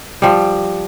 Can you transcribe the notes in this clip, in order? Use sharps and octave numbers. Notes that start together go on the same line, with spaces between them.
F3 G3